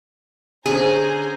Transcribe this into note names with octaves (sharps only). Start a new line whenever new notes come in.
D3 C#4 G#4 C5 G#5 A#5